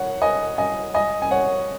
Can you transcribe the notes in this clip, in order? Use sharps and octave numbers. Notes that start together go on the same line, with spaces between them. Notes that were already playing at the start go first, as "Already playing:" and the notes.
Already playing: C#5 F#5
D#5 G#5
D#5 G#5
D#5 G#5
G#5
C#5 F#5